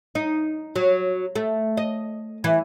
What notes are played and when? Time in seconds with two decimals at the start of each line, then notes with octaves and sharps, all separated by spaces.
0.15 D#4
0.76 F#3
1.35 A3
1.77 D#5
2.44 E3